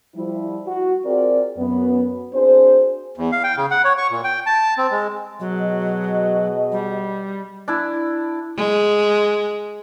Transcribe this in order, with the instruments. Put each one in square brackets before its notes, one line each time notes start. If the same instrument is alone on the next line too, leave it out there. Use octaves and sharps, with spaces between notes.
[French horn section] F3 G3 E4
F#4
C4 F4 G#4 A#4 D5
F#2 B3
C4 D4 F#4 G#4 C5
[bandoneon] E2
F5
G5
C#3
F#5
C#5
C#6
A#2
G5
A5
C4
G#3
[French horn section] B2 G#4 D#5 [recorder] F#3
[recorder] G3
[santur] D4 E4
[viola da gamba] G#3